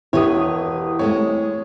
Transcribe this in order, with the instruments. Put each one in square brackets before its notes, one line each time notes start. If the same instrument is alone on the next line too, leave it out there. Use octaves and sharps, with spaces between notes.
[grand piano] E1 [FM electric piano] E4 G4 D#6 [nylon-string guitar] B4 C#5
[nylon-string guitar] G#3 A3 C4 [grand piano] C#5